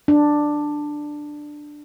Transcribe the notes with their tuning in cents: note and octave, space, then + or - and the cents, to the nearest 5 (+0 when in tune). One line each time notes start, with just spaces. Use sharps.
D4 +10